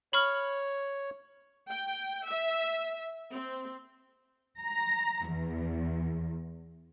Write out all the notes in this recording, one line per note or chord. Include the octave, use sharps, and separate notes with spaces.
C#5 B5 C#6 F6
G5
E5
C4
A#5
E2